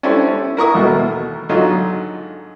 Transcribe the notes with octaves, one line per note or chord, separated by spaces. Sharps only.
C#4 D4 E4 G4 A4 C5
C#4
E4 A#4 C#6 D#6
D#2 B2 A3 A#3
G#2 D3 F#3 D#4 F4